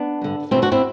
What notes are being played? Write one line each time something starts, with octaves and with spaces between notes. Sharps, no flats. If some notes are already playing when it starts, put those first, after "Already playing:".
Already playing: B3 D4
G2 D3
E2 B2 C4 E4
D4 F#4
C4 E4